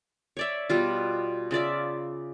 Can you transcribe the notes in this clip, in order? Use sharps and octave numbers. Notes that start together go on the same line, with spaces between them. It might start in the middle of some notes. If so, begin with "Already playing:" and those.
C#5 D5 E5
B2 G3 F4
C#3 F4 D5 E5